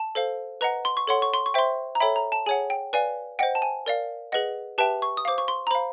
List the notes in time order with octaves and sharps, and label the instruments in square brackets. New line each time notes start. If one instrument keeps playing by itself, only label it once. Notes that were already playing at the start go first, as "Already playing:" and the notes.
Already playing: [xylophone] A5
A4 C5 F5
B4 D#5 F#5 A#5
C6
C#6
A4 C#5 F#5 C6
C#6
C6
C#6
C5 E5 G5 C6
A#5
A4 C#5 E5 G5 B5
A#5
A5
G#4 C#5 F#5 G#5
G5
B4 D5 F5 G#5
C5 D#5 F#5 G5
A5
G#5
A#4 D5 F5
G#4 B4 D#5 F#5
G4 B4 E5 G5 A5
C#6
D#6
C5 F5 D6
C#6
C6
A#5
C5 F5 B5